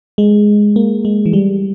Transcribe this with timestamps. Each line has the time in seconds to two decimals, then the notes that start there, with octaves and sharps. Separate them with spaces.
0.18 G#3
0.76 A#3
1.05 G#3
1.26 E3
1.33 G3